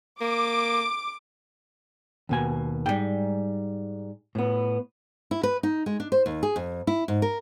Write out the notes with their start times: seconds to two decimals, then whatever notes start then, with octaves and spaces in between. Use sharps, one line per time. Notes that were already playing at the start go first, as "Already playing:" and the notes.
0.21 A#3 D6
2.29 D#2 B2 G#5
2.86 G#2 G3 G5
4.35 A2 B3
5.31 E4
5.43 B4
5.63 D#4
5.86 G#3
6.00 D4
6.12 C5
6.26 D#2
6.43 G#4
6.56 F2
6.87 E4
7.08 G#2
7.22 A#4